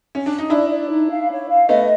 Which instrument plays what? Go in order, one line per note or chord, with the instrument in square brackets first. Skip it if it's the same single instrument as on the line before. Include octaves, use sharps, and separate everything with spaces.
[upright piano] C#4
D4
D#4
[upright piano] D4 E4 [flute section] D5
[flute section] D5
D#4
F5
C#5
F5
[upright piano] A3 B3 [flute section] D#5